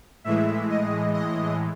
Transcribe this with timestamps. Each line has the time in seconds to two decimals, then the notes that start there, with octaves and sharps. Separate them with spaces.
0.24 A2 E3 G#3 E5
0.69 D#5
1.14 D#5